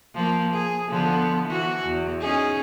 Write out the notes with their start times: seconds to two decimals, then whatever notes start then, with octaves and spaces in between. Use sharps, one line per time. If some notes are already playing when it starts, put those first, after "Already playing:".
0.14 F3 A#3
0.54 G#4
0.89 D3 F3 B3
1.47 E3 F#4
1.87 E2
2.21 C#4 D#4 G#4